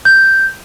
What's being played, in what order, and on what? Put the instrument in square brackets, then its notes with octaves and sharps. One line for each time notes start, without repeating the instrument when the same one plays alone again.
[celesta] G6